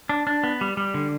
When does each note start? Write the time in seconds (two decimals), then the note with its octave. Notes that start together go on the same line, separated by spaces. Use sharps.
0.09 D4
0.27 D4
0.44 B3
0.61 G3
0.77 G3
0.94 D3